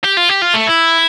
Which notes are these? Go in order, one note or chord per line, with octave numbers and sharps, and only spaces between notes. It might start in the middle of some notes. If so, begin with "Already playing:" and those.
G4
F4
G4
F4
A3
E4